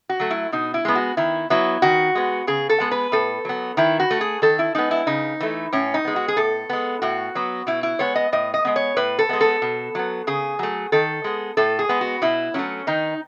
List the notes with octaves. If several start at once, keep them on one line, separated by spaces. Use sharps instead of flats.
F#4
F#3 A3
E4
B2 D#4
E4
G#3 B3
F#4
D#3 E4
F#3 B3 E4
D#3 F#4
G#3 B3
C#3 G#4
A4
G#3 B3
B4
A2 A4
F#3 B3
D#3 E4
F#4
A3
G#4
D#3 A4
E4
G#3 B3 D#4
E4
C#3 D#4
E3 A3
A2 C#4
D#4
G#3 B3
F#4
G#4
A2 A4
G#3 B3
A2 F#4
F#3 B3
B2 E4
E4
G#3 B3 C#5
D#5
A2 D#5
D#5
G#3 B3
C#5
A2 B4
A4
G#3 B3
A4
B2
F#3 B3
C#3 G#4
F#3 A3
D#3 A4
G#3 B3
A2 A4
G#4
G#3 B3
F#4
B2 E4
F#3 A3 C#4
D#3 D#4